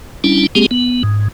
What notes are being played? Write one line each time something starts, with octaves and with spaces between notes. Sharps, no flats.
G3 C#4 D4 E4
G#3 A#3 C4 G4 G#4
B3
G#2